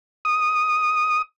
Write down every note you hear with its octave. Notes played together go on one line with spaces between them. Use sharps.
D#6